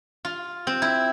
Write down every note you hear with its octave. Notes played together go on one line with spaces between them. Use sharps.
F4
C4
E4